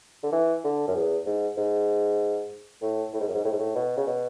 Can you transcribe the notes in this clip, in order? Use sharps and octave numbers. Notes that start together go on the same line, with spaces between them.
D3
E3
D3
F#2
E2
G#2
G#2
A2
A2
G#2
F#2
G#2
A2
G#2
A2
B2
C#3
B2